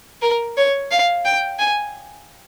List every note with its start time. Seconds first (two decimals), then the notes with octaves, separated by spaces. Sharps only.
0.22 A#4
0.57 C#5
0.91 F5
1.25 G5
1.59 G#5